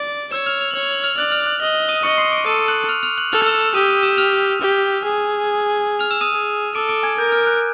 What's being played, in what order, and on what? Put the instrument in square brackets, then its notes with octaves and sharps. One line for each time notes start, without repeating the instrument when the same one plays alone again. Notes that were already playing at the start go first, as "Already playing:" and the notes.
Already playing: [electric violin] D5
[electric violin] C#5 [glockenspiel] E6 E7
[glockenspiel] F6 F7
F7
[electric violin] C#5 [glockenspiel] F#7
[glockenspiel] F7
F#7
F6 F7
[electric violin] D5 [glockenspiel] F#6 F#7
[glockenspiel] F6 F7
F#6 F#7
[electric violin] D#5
[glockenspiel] D#6 D#7
[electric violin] D#5 [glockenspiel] C#6 C#7
[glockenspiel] C6 C7
D6 D7
[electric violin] A4 [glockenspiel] D#6 D#7
[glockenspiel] F#6 F#7
F6 F7
F6 F7
F#6 F#7
[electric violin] A4 [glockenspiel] F6 F7
[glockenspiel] E6 E7
E6 E7
[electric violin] G4 [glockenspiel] D#6 D#7
[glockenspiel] D#6 D#7
E6 E7
F6 F7
[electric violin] G4
G#4
[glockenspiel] F6 F7
E6 E7
D#6 D#7
[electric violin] G#4
[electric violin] A4 [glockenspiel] D6 D7
[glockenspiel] D6 D7
G#5 G#6
[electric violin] A#4 [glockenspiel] G6
[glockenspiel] F6
F#6